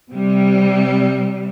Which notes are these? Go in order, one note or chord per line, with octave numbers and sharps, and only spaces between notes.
C3 G3